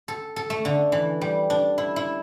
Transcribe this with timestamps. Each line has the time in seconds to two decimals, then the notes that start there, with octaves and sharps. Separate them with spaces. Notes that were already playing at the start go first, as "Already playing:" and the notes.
0.08 A4
0.36 A4
0.50 A3
0.65 D3
0.92 E3
1.21 G3
1.50 D4
1.78 E4
1.96 E4